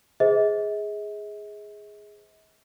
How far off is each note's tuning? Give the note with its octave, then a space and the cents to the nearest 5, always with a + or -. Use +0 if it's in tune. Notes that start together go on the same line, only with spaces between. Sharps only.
G#4 +0 C5 -25 D#5 +45